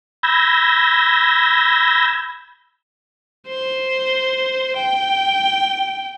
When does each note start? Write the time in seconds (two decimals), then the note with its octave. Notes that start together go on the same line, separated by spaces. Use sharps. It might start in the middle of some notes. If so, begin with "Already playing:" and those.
0.23 B5 E6 G6 G#6 A#6
3.47 C5
4.77 G5